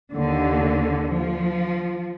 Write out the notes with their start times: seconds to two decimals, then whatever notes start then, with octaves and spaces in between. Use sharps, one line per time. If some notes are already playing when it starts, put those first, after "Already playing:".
0.13 D#2 D3
1.15 F3